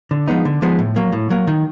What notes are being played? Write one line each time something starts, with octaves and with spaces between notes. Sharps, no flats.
D3
F3 G#3 B3 D#4
D3
F3 G#3 B3 D#4
A2
F#3 A#3
A2
F#3 A#3
D#3